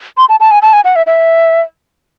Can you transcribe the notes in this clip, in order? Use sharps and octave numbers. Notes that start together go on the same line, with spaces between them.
C6
A5
A5
G#5
A5
G#5
F#5
E5
E5